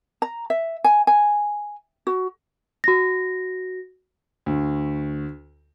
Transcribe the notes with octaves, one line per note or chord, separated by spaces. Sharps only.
A#5
E5
G#5
G#5
F#4
F#4 A#6
D2